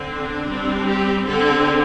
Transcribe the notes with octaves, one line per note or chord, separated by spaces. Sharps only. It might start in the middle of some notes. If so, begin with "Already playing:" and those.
Already playing: D3 C4
D4
G3 C4
G4
D3 C4 A4